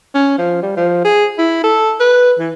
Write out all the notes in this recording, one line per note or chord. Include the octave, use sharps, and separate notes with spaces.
C#4
F3
G3
F3
G#4
E4
A4
B4
E3